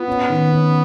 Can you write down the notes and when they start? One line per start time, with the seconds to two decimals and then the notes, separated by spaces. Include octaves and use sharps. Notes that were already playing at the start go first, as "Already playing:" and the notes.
Already playing: B3 F4
0.08 C#4
0.30 D#3
0.52 C#4